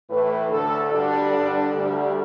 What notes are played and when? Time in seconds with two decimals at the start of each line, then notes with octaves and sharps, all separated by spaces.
0.09 A2 E3 A3 B4
0.50 D2 D3 A3 A4
0.91 G2 D3 G3 D4
1.32 G2 D3 G3
1.73 D2 D3 G3